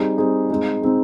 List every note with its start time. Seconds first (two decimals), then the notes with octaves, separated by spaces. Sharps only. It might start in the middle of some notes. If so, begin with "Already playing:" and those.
Already playing: G3 C4 D#4 G#4
0.18 G3 C4 D#4 G#4
0.50 G#3 C4 D#4
0.82 G#3 C4 D#4